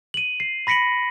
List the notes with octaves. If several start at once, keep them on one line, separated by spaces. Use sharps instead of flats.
D#7 F#7
C7
B5 A#6 B6 C#7 D7 F#7